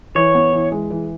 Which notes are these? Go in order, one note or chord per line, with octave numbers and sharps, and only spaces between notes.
E3 C#5
B3
E3
G#3
E3